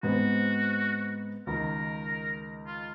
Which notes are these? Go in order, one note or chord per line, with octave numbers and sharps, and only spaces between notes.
G#2 B3 C4 F#4
C#2 D#3 A#4
F4